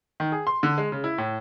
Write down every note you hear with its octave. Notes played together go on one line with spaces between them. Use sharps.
D#3
G#4
C6
D3
G#3
C#3
E4
A2